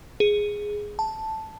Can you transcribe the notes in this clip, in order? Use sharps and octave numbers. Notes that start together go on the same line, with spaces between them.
G#4
A5